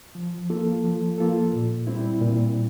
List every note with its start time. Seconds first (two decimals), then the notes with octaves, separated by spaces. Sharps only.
0.15 F3
0.50 A#3 F4 A4
0.85 F3
1.18 A#3 F4 A4
1.53 A#2
1.87 G3 C4 E4
2.22 A#2